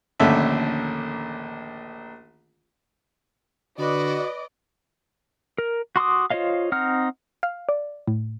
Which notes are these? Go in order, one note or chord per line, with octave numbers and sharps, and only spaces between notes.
A#1 D#2 D3 A3 C#4 E5
D3 F#4 B4 D5 D#5 D6
A#4
F#4 C6 D6 D#6
F4 C5 C#5 D#5 F5
C4 D#4 F#5 F6
F5
D5
A2